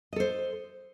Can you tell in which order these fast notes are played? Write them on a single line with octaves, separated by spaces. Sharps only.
D#5 A4 C5